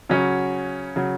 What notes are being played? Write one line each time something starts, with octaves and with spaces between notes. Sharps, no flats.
C#3 F#3 C#4 F#4
C#3 F#3